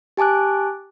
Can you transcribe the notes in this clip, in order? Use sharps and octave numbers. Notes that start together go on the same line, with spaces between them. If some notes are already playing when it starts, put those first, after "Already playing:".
G4 G#5 A5 D6 F#6